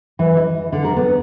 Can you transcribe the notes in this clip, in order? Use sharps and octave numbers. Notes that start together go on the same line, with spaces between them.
E3
D#5
D3
A#4
B3